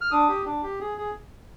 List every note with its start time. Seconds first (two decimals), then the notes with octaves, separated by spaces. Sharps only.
0.01 F6
0.11 D4 D#6
0.28 G4
0.46 D4
0.63 G4
0.80 G#4
0.98 G#4